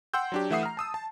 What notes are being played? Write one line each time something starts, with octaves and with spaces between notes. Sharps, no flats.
F#5 G5 C6 E6 G6
F#3 D4 G4
E3 A3 E5 F#5 D#6 C7
A#5 F6
A5 D#6 E6
A5